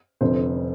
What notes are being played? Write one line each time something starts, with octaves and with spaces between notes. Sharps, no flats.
F1 F2 D3 F3 C5